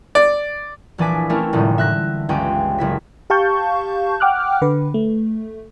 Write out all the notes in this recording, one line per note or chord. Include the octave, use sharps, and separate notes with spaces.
D5
A#1 E3 D4 G#5 D6 B6
A3 C4 C#4 E4 A#4
F1 A2 D3 G3 G#3 D#4
E5 F#6 A#6
G1 C#2 G#3 C#4 G5
F#1 E4 B6
G4 F5 A5 C#6 G6
F#5 G5 D6 F6 F#6
D3 B4
A3